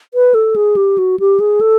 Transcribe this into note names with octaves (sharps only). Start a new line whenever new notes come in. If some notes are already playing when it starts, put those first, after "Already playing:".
B4
A4
G#4
G4
F#4
G4
G#4
A4